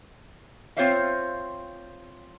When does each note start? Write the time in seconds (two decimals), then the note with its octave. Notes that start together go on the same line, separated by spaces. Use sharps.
0.77 C4 F4 C5 C#5 E5 F5